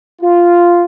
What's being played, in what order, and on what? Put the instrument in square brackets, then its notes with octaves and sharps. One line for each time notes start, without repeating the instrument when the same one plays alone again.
[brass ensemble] F4